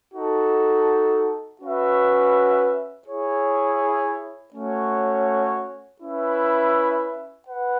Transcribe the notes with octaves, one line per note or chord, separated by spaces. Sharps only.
D#4 F#4 A4
C#4 F#4 B4 E5
E4 G#4 C#5
A3 C#4 F#4 C#5
C#4 E4 B4 E5
B4 F#5